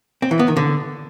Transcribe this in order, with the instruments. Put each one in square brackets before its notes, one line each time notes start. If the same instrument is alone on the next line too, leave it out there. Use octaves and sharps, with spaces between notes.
[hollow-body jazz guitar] C4
E3
B3
D#3
D3